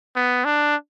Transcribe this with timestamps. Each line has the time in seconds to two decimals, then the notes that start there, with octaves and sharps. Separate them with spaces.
0.16 B3
0.45 D4